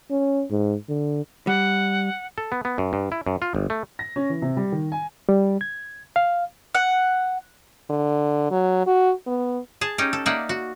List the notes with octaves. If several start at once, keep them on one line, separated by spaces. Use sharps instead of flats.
C#4
G#2
D3
G3 F#5
A4
B3
B3
F#2
G2
E4
F#2
F4
G1
A3
A#6
C#4
E3
C3
G3
D#3
G#5
G3
G#6
F5
F#5
D3
F#3
F#4
B3
G#4 A5
C#4 D#4 G4
A4
A#3 D#4 D5 E5 F#5
F#4